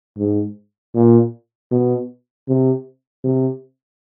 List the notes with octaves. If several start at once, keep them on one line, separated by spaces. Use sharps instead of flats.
G#2
A#2
B2
C3
C3